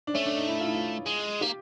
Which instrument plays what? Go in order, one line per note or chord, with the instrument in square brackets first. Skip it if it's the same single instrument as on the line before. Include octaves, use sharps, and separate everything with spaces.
[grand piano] D4
[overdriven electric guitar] A3 [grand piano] C#4
[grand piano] D4
D#4
E4
F4
E4
F4
[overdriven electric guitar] G#3
[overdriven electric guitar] A#3 [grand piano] G4